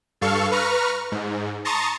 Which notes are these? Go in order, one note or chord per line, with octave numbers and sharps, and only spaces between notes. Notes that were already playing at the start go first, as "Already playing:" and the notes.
G2 A4 F5 C#6
B4 A#5 C#6 F6
G#2
A5 A#5 C6 C#6 D#6 A6